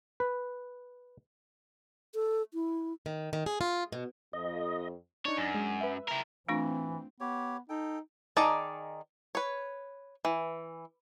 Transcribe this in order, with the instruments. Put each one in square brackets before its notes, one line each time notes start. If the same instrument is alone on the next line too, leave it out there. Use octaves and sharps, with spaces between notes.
[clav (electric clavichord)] B4
[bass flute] A4
E4
[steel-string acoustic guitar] D#3
D#3
G#4
F4
B2
[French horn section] F2 [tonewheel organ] D#5
[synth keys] D4 D#4 [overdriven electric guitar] C#5
[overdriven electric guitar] F#2
[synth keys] G#3
B4 E5
[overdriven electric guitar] E4 A#4
[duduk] E3 [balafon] A3 D4 F4 [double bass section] C4
[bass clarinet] B3 [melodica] G4 C#5
[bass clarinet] D#4 [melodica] A4 G5
[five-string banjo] D#3 D#4 G#4 D5 A5
B4 C#5
E3